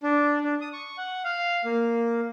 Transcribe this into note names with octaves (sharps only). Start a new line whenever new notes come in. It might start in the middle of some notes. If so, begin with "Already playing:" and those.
D4
D4
D#6
C#6
F#5
F5
A#3